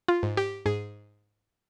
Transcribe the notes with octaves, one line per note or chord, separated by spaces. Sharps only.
F4
G#2
G4
G#2 G#4